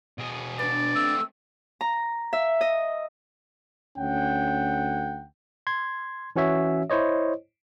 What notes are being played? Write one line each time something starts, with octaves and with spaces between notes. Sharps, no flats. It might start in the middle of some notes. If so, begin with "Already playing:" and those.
B2 G#4
B3 D4 D5
A3 C4 E6
A#5
E5
D#5
D2 C#4 F#5 G5
C6 G#6
E3 C#4 F#4 C#5 E5
E4 C5 C#5 D#5